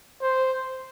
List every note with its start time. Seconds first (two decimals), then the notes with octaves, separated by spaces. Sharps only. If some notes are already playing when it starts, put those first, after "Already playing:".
0.22 C5